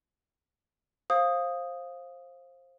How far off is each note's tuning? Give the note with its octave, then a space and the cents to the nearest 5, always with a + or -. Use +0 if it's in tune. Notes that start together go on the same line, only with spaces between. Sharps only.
C5 +20 F5 +0 D#6 +0